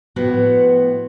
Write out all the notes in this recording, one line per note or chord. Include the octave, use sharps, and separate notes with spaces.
A2 F3 B3 F#4